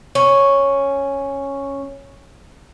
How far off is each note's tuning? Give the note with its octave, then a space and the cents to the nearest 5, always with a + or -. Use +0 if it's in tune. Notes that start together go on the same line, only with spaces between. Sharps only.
C#4 -5